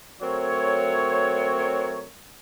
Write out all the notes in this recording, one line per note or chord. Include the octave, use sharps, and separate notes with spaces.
F#3 A3 C4 A#4 C#5